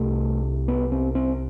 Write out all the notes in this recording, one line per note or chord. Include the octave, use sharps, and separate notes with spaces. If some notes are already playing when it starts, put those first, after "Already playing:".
Already playing: C2 C3 A3
B3
C4
C4